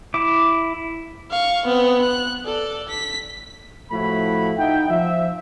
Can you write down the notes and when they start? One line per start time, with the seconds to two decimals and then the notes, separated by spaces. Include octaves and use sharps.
0.14 E4 D6
1.30 F5 C#6
1.65 B3 C4
2.01 F#6
2.45 A4 D5
2.89 B6
3.92 A2 F3 A3 E4 F#4 B5
4.58 D#4 E5 F#5 G5
4.90 F3 E5